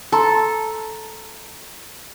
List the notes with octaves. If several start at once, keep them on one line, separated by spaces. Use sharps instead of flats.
A4 A5 A#5 C6